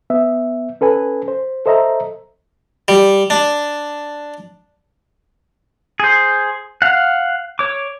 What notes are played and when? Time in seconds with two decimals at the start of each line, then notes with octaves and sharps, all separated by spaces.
0.10 B3 E5
0.81 C#4 A4 B4 G#5
1.28 C5
1.66 A4 C5 D#5 E5 A#5
2.88 G3
3.30 D4
6.00 G#4 C5
6.82 F5 F#5
7.59 C#5 D6